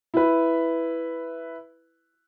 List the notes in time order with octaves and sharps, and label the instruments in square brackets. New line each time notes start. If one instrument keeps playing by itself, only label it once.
[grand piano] E4 B4